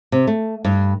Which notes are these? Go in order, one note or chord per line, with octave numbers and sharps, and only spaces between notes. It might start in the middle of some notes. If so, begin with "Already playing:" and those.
C3
A3
G2